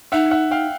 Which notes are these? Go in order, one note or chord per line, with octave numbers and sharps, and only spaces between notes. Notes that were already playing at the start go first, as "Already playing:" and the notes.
D#4 E5 F#5
E5 F#5
F5 G5